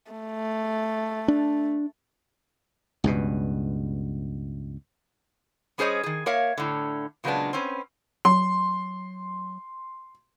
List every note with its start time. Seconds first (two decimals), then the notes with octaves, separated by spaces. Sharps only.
0.12 A3
1.28 D4
3.04 C#2 G2 B2
5.78 G3 C#4 G#4 C5 C#5 D#5
6.03 D#3 G#4
6.26 A#3 A#4 C#5 E5 F5
6.58 A2 D3
7.24 A#2 C#3 F#3 G#3 B3 D4
7.53 C4 C#4 B4
8.25 F#3 C6